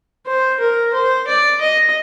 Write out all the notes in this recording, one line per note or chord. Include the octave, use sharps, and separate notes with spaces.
C5
A#4
C5
D5
D#5